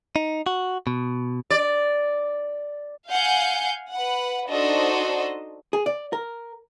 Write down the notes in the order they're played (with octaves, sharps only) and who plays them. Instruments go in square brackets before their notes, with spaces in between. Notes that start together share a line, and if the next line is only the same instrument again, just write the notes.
[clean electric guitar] D#4
F#4
B2
[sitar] D5
[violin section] F5 F#5 G#5 G6
B4 F#5
D4 D#4 F#4 A4 C5 D#5
[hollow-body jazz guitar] G#4
D5
A#4